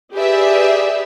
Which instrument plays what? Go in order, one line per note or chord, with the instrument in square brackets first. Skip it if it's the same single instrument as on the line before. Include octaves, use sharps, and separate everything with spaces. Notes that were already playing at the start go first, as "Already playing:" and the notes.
[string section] G4 G#4 B4 D5 E5